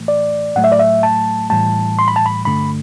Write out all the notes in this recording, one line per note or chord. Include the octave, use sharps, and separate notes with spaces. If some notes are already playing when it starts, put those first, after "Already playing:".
Already playing: A2 E3 A3
D5
A2 F#3 A3 F#5
E5
D5
E5
A5
A2 E3 G3 A5
C6
B5
A5
B5
G2 D3 A3 B5